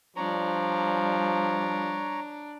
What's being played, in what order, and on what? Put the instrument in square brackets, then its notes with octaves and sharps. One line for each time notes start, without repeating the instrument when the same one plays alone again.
[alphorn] F3 [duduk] G3 [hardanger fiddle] D4 [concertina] C#5 A#5